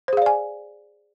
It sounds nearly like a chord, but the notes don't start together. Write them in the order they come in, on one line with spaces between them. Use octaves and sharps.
C5 G#4 F5 D5 G#5